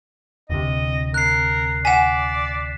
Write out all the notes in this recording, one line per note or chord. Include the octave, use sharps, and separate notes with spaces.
D1 C3 D#5
A#4 F#6 C7
D5 F#5 G#5 B6 E7